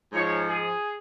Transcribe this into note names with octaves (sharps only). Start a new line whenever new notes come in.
G#2 F3 C#5
G#4